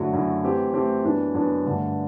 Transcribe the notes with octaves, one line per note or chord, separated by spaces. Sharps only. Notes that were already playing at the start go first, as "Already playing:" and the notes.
Already playing: F#2 D3 F#3 A3 E4
F#2 D3 F#3 A3 E4
E3 A3 C4 G4
E3 A3 C4 G4
F#2 E3 B3 D4
F#2 E3 B3 D4
G2 D3 A3